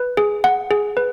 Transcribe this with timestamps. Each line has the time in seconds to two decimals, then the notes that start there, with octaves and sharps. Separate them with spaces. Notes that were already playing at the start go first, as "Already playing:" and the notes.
Already playing: B4
0.17 G#4
0.44 F#5
0.71 G#4
0.97 B4